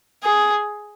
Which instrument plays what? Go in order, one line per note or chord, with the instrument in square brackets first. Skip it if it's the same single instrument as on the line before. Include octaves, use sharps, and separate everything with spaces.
[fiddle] G#4